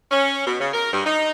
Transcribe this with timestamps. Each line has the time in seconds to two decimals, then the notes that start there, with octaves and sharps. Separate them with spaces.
0.11 C#4
0.46 B2
0.60 C#3
0.72 A#4
0.92 G2
1.05 D#4